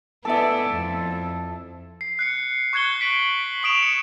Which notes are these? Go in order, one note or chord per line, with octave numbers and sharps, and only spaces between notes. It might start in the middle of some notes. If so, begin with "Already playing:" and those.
B3 E4 A4 D5 E5
F2
C7
F#6 C7 C#7
C#6 F#6 G#6 C#7 G7
B6 D7 F#7
C#6 D#6 D7 E7 F7
C#7